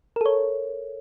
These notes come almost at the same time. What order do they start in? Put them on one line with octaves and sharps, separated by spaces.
A#4 A4 C#5